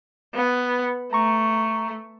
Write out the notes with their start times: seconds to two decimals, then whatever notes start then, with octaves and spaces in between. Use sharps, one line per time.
0.34 B3
1.13 A3 A#5 C#6